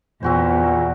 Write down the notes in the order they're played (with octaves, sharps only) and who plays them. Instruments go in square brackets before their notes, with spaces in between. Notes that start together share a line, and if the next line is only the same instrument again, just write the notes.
[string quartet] E2 [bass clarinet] A#2 [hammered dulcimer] C4 F#4 C5